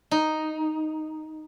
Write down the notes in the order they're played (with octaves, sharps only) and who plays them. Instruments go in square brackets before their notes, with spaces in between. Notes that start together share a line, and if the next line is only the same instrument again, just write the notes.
[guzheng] D#4